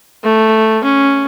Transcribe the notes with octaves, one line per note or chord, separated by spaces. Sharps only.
A3
C#4